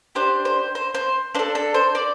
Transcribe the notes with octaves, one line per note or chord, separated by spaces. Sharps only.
D4 G4 C5
C5
C5
C5
D4 A4 C5
A4
C5
D5